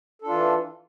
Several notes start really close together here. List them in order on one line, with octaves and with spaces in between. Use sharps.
A4 D4 F4 E3